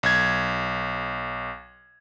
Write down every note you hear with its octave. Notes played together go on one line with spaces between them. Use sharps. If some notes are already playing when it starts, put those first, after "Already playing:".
B1 G#6